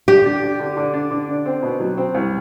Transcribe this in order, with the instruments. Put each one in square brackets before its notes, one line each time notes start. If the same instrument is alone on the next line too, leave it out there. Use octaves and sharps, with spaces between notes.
[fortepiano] D3 [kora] G4
[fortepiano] D4
D4
D3
D3
D4
D3
D4
C4
B2
F#3
C4
C2